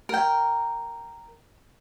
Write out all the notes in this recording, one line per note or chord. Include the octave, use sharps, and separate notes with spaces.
A#4 G5